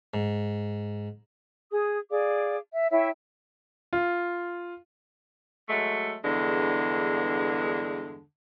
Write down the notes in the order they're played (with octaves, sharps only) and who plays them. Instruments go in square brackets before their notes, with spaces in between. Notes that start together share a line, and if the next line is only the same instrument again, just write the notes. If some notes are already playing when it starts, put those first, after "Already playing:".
[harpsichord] G#2
[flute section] G#4 D#6
G#4 D5 F5 D6
E5
E4 C#5 E5 G5
[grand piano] F4
[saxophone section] F#3 G#3 A3
E2 G2 D3 G#3